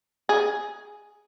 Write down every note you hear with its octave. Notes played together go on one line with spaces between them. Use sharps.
G#4